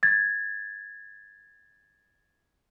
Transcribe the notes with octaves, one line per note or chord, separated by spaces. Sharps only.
G#6 A6